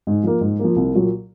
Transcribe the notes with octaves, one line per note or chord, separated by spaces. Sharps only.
G#2
F3 A#3
G#2
F3 A#3
C2
A#2 F#3